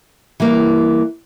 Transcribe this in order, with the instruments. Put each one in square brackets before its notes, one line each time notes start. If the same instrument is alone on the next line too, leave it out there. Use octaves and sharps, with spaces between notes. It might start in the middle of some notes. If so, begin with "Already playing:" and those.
[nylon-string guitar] E3 G3 A#3